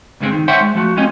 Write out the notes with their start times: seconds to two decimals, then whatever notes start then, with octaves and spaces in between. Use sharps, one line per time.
0.20 C#2 G2 D3 G3 G#3 C4
0.32 D#3
0.48 C5 C#5 E5 F#5 G5 C6
0.61 G#3
0.75 F3 A3 F#4
0.97 G#3 A3 C4 C#4 F4 D#5